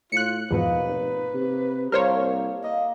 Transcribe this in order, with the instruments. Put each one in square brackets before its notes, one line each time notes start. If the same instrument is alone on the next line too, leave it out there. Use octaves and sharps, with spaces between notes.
[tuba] A2 [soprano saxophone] F4 [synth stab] F#6 C#7
[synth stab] E2 G#2 B2 [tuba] F3 [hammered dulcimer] A#3 D#4 [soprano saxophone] B4
[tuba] F1
C3
[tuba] C2 [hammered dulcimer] A#3 A4 [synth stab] A#4 C5 C#5
[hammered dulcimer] A#3 [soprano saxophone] D#5